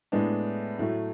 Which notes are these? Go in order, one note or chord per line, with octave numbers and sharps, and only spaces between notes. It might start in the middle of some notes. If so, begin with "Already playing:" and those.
A2 G#3 B3 D4
A2 F#3 A3